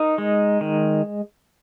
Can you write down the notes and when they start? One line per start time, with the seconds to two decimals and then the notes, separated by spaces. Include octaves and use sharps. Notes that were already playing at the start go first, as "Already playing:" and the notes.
Already playing: D#4 A#4
0.18 G#3
0.61 D#3